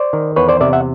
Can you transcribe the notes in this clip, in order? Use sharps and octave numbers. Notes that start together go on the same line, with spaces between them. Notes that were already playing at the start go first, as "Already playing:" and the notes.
Already playing: C5 D5
D#3
E2 B4 C#5
C5 D5
C3 D5 E5
E5 F#5